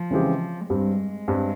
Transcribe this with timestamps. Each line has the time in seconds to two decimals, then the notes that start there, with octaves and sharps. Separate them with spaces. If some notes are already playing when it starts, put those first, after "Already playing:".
Already playing: F3
0.11 C#3 E3 G#3 C4 G4
0.70 G2 G3 G#3 C4
1.28 G2 G3 C4